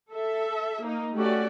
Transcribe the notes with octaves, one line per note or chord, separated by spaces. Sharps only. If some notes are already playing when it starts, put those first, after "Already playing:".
A4 E5
A#3 D#4
A3 C#4 F#4 G4 D5